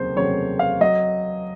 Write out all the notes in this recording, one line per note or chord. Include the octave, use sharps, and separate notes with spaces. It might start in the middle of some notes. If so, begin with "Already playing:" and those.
Already playing: F1 D#2 C#3 F#3 C5
F1 D#2 C#3 F#3 C#5
F5
F#3 D#5